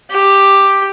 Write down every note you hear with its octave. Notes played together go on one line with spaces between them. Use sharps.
G4